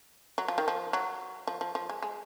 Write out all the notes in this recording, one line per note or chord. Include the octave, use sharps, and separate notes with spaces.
F#3
F3
D#3
F3
F#3
F3
F3
F3
G#3
G#3